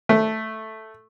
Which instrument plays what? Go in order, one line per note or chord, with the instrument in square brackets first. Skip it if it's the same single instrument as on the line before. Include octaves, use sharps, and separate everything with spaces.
[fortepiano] A3